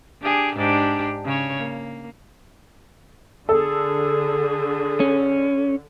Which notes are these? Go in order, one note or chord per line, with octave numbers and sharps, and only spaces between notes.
D4 G4 G#4
G#2 D4 G4
C#3 C#5
A#3
D3 G#4 A4
C#4